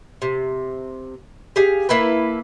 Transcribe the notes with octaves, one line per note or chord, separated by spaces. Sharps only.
C3
G4 G#4 F5
A#3 E4 A4 B4